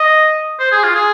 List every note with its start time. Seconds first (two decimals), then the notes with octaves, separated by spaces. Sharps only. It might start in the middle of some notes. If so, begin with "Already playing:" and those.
Already playing: D#5
0.60 C5
0.72 G#4
0.83 F4
0.95 G#4